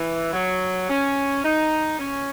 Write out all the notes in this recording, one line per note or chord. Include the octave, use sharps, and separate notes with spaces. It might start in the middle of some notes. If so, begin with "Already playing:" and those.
Already playing: E3
F#3
C#4
D#4
C#4